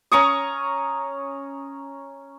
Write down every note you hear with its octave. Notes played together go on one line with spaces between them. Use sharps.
C#4 A#5 C#6 D#6